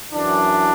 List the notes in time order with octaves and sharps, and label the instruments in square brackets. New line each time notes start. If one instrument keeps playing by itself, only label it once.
[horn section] F#2 E3 D4